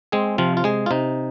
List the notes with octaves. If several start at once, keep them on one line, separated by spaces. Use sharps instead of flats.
G#3 C4 G#4
C3 F3 F4
F4
G#3 G#4
F4
C3 D#4